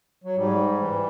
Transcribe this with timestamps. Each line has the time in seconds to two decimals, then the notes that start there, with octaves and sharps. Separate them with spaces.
0.24 F#3
0.36 G#2 G3
0.80 E3